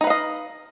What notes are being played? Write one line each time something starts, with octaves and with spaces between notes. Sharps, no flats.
D#4 B4 D#5 F5